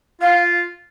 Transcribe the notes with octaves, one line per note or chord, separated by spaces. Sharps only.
F4 F5